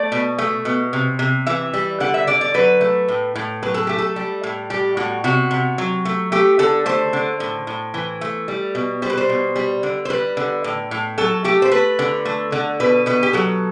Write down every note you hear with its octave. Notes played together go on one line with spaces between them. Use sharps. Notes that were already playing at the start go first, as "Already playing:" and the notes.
Already playing: A3 D5
B2
A3
B2
C3
C3
E3 E5
G3
D3 F#5
E5
D3 D5
D5
F#3 B4
A3
A2
A2
F#3 B4
A4
A3 G4
A4
G3
A2
G3 G4
A2 F#4
C3 F#4
C3
F#3
A3
A3 G4
D3 A4
A3 C5
D3
A2
A2
E3
A3
G3
B2
G3 C5
B4
C5
B2
G3
D3
C5
G3 B4
D3
A2
A2
F#3 A4
A3 G4
C5
A3 B4
D3
A3
D3
B2 B4
B2 B4
G4
F#3 A4